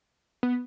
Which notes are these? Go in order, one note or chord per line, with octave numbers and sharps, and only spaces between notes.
B3